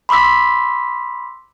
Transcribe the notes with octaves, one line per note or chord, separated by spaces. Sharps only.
B5 C6 D6 E6 B6